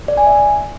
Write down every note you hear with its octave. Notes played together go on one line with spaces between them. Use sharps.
D5
G#5
E5